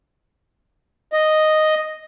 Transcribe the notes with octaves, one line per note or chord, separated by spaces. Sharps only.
D#5